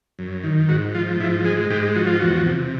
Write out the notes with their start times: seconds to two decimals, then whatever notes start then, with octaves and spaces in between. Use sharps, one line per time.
0.19 F#2
0.43 D#3
0.69 G#2 F#4
0.94 F3 F4
1.20 G#2 E4
1.45 G#3 G#4
1.70 G#2 G4
1.96 F3 F#4
2.07 F4
2.19 E2 F#4
2.46 C3